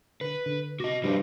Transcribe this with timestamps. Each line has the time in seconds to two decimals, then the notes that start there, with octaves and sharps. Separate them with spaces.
0.21 D3 B4
0.46 D3
0.80 C3 F#4 D#5 D6 A#6
1.04 G2 F3 E4 C5